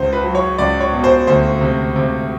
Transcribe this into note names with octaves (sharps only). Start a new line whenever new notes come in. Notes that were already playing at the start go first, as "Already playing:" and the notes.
Already playing: C#2 C5
B4
F#3
C#5
C#2 D5
C#5
B2
C5
D2 C5
C3
C3